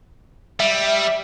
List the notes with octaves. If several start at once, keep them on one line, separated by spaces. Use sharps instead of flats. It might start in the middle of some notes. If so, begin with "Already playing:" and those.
G3 E5